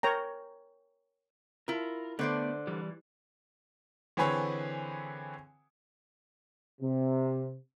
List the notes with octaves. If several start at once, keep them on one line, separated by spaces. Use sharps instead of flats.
A#4 C#5 G5 A#5
E4 F4 A#4
D3 A3 B3 C5 D5
E3 G3
D3 E3 C4 G#4 B4 C#5
C3